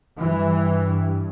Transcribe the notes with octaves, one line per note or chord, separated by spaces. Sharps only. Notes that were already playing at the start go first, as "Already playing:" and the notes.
G2 E3